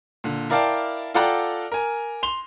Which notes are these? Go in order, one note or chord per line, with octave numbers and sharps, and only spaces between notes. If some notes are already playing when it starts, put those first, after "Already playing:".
A#2 D3
E4 A#4 D5 F5 G5 A5
F4 A4 D5 F#5 G5 A#5
A#4 G#5
C6 F7 G7